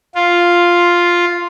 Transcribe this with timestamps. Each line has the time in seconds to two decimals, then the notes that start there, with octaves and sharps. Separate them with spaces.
0.15 F4